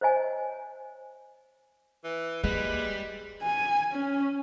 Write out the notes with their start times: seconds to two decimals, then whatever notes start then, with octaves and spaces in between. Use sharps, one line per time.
0.01 C5 C#5 D#5 G#5
2.04 E3
2.44 G3 G#3 A#3 B4
3.42 G#5
3.92 C#4